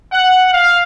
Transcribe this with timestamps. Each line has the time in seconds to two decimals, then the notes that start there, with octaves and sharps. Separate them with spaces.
0.11 F#5
0.52 F5